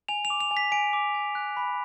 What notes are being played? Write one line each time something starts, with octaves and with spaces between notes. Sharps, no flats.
G#5 F7
F7
D6
F7
G#5
B6
G#5 D7
D6
G#5
F#6
B5